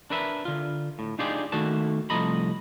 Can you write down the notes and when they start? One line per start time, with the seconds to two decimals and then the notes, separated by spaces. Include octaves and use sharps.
0.10 D4 A#4 B4 E5
0.45 D3 F4
0.99 A2
1.19 D4 D#4 F4 G4 G#4 D5
1.52 D#3 A3 A#3 F#4 A5
2.10 C2 F3 A3 D#5 A#5 B5